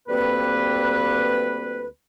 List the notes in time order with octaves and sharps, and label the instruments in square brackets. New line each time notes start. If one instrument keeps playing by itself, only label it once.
[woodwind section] D2 G3 A#3 C4 B4